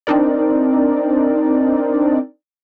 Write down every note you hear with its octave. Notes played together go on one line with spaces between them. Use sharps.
C4 D4 D#4 A#4 D5